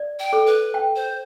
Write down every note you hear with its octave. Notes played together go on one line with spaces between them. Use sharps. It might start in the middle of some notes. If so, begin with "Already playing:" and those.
Already playing: D5
G5
A4
B4
G5
C5